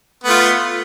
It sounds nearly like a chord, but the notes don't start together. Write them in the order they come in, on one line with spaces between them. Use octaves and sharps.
B3 A3 F4